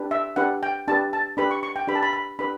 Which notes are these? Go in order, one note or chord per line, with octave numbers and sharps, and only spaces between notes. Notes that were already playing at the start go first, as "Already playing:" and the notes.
Already playing: D4 G4 B4
E5
D4 G4 B4 F#5
G5
D4 G4 B4 A5
A5
D4 G4 B4 B5
C#6
C#6
G5
D4 G4 B4 B5
A5
B5
B5
D4 G4 B4 B5